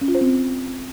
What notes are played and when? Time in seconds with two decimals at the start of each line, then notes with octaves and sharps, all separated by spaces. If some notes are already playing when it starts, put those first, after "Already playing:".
0.01 C#4
0.08 F4
0.15 C5
0.21 C4